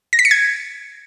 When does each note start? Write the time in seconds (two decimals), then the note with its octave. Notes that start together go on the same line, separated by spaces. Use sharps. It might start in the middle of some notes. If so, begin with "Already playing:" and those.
0.13 A#6
0.19 B6
0.25 C#7
0.31 G#6